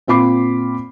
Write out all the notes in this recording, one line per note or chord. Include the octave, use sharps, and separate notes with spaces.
A#2 C4 F4 B5 D6 C7